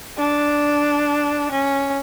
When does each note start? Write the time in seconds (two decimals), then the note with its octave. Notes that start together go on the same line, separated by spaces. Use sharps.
0.18 D4
1.51 C#4